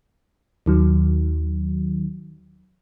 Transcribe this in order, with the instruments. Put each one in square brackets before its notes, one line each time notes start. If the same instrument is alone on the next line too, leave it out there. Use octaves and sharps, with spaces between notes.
[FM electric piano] D#2 D#3 F#3